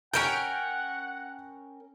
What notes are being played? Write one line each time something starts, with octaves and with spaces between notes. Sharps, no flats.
C#4 A#4 F#5 G5 G6 D7